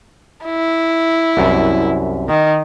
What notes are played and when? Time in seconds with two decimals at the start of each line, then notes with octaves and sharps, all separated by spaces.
0.46 E4
1.37 C2 F#2
2.29 D#3